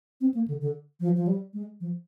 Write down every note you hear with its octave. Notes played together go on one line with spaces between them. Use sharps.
C4
A#3
D3
D3
F3
F3
G3
G#3
F3